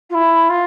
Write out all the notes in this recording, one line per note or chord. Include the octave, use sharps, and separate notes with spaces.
F4
E4
F4